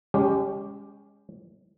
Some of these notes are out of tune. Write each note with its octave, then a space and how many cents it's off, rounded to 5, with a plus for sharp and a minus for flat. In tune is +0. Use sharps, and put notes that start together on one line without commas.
G#3 -25 C#4 +20 G4 +0